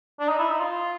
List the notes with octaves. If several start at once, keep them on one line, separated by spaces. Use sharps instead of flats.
D4
D#4
E4
D#4
F4